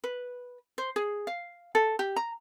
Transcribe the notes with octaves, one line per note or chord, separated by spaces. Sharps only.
B4
C5
G#4
F5
A4
G4
A#5